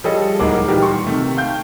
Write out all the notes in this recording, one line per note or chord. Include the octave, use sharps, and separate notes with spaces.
F3 G3 G#4 A4 C#5 D#5
D1 D#2 G#3 A#4 F#5 D6
A#2 D#3 E3 G3 F#4 G4
C6 C#6
C3 D#3 A3
F5 G5 G6